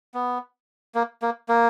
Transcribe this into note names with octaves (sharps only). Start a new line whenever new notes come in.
B3
A#3
A#3
A#3